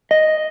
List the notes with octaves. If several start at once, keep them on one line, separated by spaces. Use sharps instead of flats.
D#5